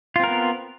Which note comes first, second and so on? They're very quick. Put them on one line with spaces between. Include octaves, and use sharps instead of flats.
F4 C4 A#4 B3